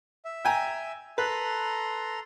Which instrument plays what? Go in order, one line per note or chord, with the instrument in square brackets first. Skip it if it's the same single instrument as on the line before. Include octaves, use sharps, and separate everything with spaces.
[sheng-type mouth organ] E5
[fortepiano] G5 G#5 A#5
[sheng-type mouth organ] A4 A#5 C6 [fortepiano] B4